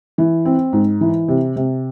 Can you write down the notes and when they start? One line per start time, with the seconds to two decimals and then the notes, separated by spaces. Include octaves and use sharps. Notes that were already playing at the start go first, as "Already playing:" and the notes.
0.18 E3
0.45 C4
0.73 G#2
1.01 E3
1.28 C3
1.56 C3